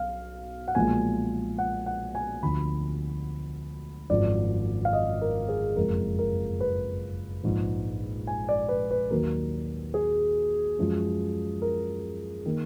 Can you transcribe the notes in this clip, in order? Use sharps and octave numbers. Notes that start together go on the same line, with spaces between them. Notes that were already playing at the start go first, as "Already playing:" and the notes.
Already playing: B1 F5
F#5
B1 A#2 F3 G#3 G#5
F#5
F#5
G#5
D2 D3 F3 B5
G#1 F#2 F3 G#3 D5
F5
D#5
A#4
G#4
F#1 F2 F3 G#3 A#4
A#4
B4
A#1 G#2 F3 G#3
G#5
D5
B4
B4
D#2 D#3 F#3 A#3 A#4
G#4
F#2 F3 G#3
A#4
D#3 A#3